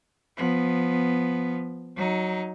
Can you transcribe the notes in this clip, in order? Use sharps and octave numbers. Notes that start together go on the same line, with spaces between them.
F3 B3
F#3 D#4